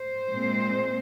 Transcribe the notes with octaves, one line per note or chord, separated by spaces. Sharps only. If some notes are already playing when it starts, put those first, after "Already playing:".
Already playing: C5
A#2 G#3 C4